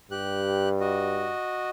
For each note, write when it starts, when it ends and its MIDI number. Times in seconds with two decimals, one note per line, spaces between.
0.11 1.34 43
0.11 0.69 67
0.11 0.69 90
0.80 1.70 66
0.80 1.70 75